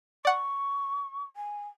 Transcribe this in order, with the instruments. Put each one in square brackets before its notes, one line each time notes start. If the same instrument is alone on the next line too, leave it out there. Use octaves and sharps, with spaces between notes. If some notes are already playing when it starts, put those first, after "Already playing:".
[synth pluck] D5 F#5 [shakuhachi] C#6
[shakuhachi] G#5